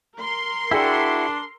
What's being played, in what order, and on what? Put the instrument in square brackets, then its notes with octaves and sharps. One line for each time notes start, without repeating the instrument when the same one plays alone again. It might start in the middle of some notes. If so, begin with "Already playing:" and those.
[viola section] A#4 C6
[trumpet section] D4 [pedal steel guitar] E4 F#4 [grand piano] G#4 G5 E6